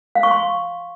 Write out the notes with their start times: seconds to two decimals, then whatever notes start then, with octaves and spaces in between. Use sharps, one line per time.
0.15 F5
0.23 C#6
0.31 C6